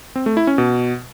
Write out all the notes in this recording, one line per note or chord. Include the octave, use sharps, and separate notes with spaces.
C4
A3
E4
C#4
B2